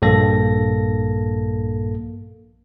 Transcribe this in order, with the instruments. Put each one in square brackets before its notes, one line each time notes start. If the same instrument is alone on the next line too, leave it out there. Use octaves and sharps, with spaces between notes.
[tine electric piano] A#1 G2 A#3 A4 A#6